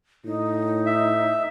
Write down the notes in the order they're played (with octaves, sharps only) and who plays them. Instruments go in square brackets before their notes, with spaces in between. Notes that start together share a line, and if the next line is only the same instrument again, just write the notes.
[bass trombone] A2 [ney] D#4
[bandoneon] E5